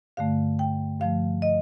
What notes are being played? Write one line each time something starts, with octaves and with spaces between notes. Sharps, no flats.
G2 D3 A3 F5
G5
G2 F3 A3 F5
D#5